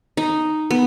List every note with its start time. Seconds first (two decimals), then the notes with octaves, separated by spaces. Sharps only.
0.17 D#4
0.71 B3